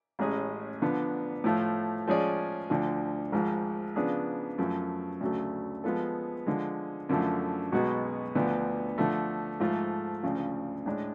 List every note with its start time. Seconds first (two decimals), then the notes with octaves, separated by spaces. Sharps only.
0.19 A1 A2 G#3 C#4 G#4
0.82 D3 F3 B3 D4
1.44 A2 F3 A3 F4
2.08 F3 G#3 C#4 G#4 D5
2.70 D2 D3 F3
3.32 G#1 G#2 F3
3.96 C#3 F3 B3 D4 G#4
4.58 F#2 F3 A3
5.21 D2 C#3 F#3 A3
5.84 F3 G#3 B3 F4 A4
6.47 D3 F3 G#3
7.09 F#2 D3 F3 A3
7.72 B1 B2 G#3 B3 F#4
8.35 D2 D3 F3 B3
8.98 D3 F3 A3
9.60 G#2 F3 A3 F4 A4
10.23 D2 C#3 F3
10.86 A2 G#3 D4